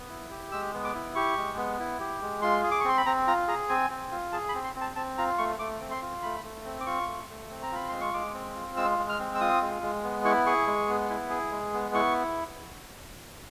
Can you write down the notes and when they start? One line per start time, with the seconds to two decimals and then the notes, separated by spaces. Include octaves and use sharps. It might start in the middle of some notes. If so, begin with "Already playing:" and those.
Already playing: B3
0.10 E4
0.31 G4
0.52 G#3 E6
0.74 B3
0.84 D6
0.95 E4
1.15 G4 C#6
1.37 G#3
1.57 B3
1.80 E4
2.00 G4
2.22 G#3
2.42 F4 C6
2.63 G#4
2.71 D6
2.80 C#6
2.85 C4 C6
2.97 B5
3.06 C4 A#5
3.27 F4 A#5
3.48 G#4 A#5
3.69 C4 G#5
3.90 C4
4.12 F4
4.32 G#4 A5
4.49 B5
4.55 C4
4.64 C6
4.75 C4
4.81 A5
4.96 C4 A5
5.18 F4 A#5
5.38 A3 C#6
5.59 A3 D6
5.81 C4
5.91 C6
6.02 F4
6.23 A3 B5
6.44 A3
6.65 C4
6.80 D6
6.86 F4 C#6
7.08 A3
7.29 A3
7.50 C4
7.62 A#5
7.72 F4 B5
7.89 G#3 C6
8.01 C#6
8.14 G#3 D6
8.34 C4
8.55 F4
8.77 G#3 E6
8.99 G#3
9.09 F6
9.20 C4
9.35 E6
9.41 F4 D#6
9.62 G#3
9.83 G#3
10.04 B3
10.25 E4 C#6
10.46 G#4 C#6
10.67 G#3
10.89 B3
11.10 E4
11.30 G#4
11.51 G#3
11.73 B3
11.94 E4 C#6